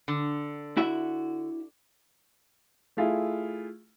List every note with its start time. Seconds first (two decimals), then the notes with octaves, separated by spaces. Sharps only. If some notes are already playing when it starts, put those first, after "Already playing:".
0.08 D3
0.77 E4 F#4 E5
2.97 A3 E4 F4 G#4